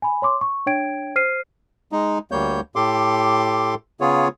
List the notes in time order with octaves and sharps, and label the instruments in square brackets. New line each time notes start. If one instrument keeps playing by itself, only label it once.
[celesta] G#5 B5
C#5 C6 D6
C#6
D4 C#5 G5 G#6 D7
C5 F6 C7 D#7
[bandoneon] G#3 D#4
D2 G3 A#3 C#5 G6
A2 G4 A4 C6 D6
C#3 B3 F4 G#4 C#5